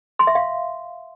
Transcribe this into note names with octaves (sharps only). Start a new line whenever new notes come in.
C6
E5
F5